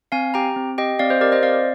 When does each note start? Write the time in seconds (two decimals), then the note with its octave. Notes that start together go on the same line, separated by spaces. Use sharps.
0.12 C4 F5 G#5
0.34 G4 G5 A#5
0.56 C4
0.78 G4 D#5 G5
0.99 C4 D5 F5
1.10 C5 D#5
1.21 G4 A#4 D5
1.32 C5 D#5
1.43 C4 D5 F5